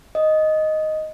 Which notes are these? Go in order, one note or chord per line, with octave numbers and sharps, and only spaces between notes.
D#5